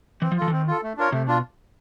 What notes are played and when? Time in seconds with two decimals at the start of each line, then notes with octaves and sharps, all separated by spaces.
0.22 E3 C4
0.32 F3
0.37 E3 F4 A4
0.48 E3
0.52 D#3 C4
0.67 F4 A4
0.83 A3
0.97 D4 F4 A#4 C#5
1.12 C3 A3
1.27 B2 D4 F4